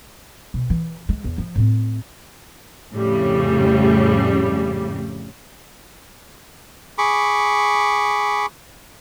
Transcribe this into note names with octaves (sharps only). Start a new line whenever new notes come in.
B2
E3
G#3
E2
F3
A2 C4
F2 A2 C#3 G3
G#4 B5 C#6 D6